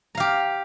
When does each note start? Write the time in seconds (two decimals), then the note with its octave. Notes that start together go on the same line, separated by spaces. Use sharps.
0.15 A#5
0.17 F5
0.20 G4